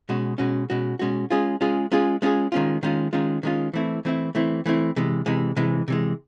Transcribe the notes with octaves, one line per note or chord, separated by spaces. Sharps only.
B2 G#3 C#4 F#4
B2 G#3 C#4 F#4
B2 G#3 C#4 F#4
B2 G#3 C#4 F#4
G#3 C#4 F4 G#4
G#3 C#4 F4 G#4
G#3 C#4 F4 G#4
G#3 C#4 F4 G#4
D#3 G#3 C#4 F4
D#3 G#3 C#4 F4
D#3 G#3 C#4 F4
D#3 G#3 C#4 F4
E3 A3 C4 E4
E3 A3 C4 E4
E3 A3 C4 E4
E3 A3 C4 E4
C3 E3 G#3
C3 E3 G#3
C3 E3 G#3
C3 E3 G#3